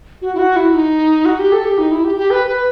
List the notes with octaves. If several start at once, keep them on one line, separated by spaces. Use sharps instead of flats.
F#4
E4
F#4
E4
D#4
F#4
G4
A4
G4
D#4
E4
G4
G4
B4
B4